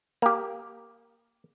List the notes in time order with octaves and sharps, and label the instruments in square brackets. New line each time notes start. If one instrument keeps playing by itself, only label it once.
[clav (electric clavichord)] A#3 G4